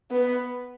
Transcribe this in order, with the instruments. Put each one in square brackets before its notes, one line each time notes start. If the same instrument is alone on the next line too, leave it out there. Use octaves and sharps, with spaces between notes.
[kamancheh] B3